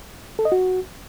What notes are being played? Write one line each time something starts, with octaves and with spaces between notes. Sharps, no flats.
A4
D#5
F#4